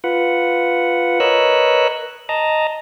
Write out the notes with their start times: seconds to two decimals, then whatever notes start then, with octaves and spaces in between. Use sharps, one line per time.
0.04 F4 B4 F#5
1.20 A#4 B4 C#5 D#5 E6 F#6
2.29 D#5 A5 A#5